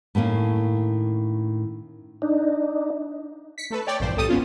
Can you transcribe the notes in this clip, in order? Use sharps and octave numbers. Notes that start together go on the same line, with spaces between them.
A2 D#3 A#3 C#4
D4 D#4
B6 C#7
A3 A4 B4
C#5 D5 G5
A#1 E2 G2 A#2 C5
C2 A2 G4 A4 A5 D#6
G1 B3 C#4 F4